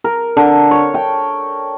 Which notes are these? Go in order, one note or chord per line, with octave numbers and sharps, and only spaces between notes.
A#4
D3
C#5
G5